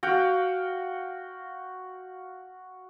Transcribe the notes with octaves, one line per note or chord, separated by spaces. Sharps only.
F#4 F5 G5